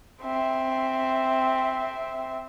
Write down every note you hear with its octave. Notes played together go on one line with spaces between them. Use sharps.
C4 E5